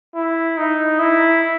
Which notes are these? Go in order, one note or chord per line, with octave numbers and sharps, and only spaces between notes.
E4
D#4
E4